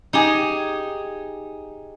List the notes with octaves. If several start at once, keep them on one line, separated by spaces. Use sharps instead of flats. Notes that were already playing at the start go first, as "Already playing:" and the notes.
D#4 G4 G#4